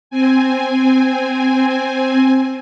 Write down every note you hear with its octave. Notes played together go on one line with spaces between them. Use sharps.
C4 G#5